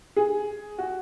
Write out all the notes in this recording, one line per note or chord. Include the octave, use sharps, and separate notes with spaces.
G#4
F#4